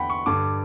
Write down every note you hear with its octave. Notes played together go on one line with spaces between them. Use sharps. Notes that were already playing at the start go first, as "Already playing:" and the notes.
Already playing: E2 D3 F#5 G5 B5
C#6
G2 D3 D6